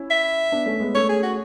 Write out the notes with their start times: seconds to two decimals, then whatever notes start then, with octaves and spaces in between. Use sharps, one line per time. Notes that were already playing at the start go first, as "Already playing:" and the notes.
Already playing: C#4 E4
0.10 E5
0.52 B3 D4
0.66 A3 C#4
0.80 G#3 B3
0.94 A3 C#4 C#5
1.09 G#4
1.23 F#4